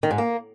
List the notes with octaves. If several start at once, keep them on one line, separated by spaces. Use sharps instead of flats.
D#3
G#2
A#3